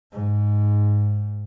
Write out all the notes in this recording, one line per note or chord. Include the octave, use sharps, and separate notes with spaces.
G#2